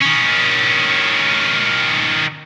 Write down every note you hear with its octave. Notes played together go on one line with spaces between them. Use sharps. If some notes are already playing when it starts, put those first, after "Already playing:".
D#3 C#4